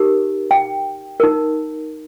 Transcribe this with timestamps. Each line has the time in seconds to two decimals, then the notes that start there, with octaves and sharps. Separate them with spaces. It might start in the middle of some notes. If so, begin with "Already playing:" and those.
Already playing: D#4 G4 A#4
0.51 G5
1.20 D#4 A#4